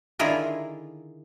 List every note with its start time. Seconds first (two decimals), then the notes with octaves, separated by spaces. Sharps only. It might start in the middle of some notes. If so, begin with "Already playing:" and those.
0.19 D3 D#3 E4 F4 G#4 A#4